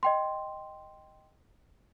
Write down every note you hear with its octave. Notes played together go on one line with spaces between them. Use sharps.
D#5 G5 C6